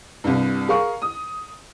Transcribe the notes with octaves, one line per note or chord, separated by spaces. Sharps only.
C2 G2
G#4 A#4 F5 C#6
D#6